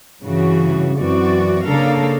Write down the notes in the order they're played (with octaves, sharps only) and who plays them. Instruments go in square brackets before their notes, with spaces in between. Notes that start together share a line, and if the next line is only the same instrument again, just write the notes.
[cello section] G2 C#3 E3 F#4
F#2 E3 C4 F#4 D5
C#3 A#3 D4 A4 A#4 F5